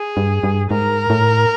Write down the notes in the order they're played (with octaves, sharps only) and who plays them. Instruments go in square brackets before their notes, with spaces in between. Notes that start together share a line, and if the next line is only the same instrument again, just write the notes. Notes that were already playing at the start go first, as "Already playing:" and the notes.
Already playing: [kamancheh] G#4
[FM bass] G2
G2
[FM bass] G#2 [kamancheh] A#4
[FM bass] A2